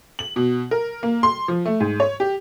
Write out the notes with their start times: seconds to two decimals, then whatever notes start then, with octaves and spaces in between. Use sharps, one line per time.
0.19 F#7
0.36 B2
0.71 A#4
1.03 A#3
1.23 C6
1.48 F3
1.66 A3
1.80 G#2
2.00 C#5
2.20 G4